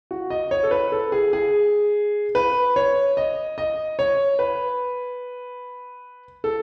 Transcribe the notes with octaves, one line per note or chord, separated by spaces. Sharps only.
F#4
D#5
C#5
A4
B4
A4
G#4
G#4
B4
C#5
D#5
D#5
C#5
B4
A4